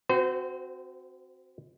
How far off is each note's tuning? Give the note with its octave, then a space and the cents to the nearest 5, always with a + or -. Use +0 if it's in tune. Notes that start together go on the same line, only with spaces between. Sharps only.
C4 +0 F#4 +0 C5 -40